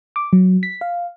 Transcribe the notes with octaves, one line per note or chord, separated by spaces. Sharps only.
D6
F#3
B6
F5